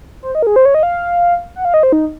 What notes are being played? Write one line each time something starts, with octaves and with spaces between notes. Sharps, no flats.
C5
D#5
A#4
G#4
C5
C#5
D#5
F5
F#5
F5
D#5
C5
D#4